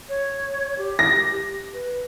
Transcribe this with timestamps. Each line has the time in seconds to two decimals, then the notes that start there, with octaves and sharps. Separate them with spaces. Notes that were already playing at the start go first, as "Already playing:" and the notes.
0.09 C#5
0.78 G4
0.99 A#6
1.74 B4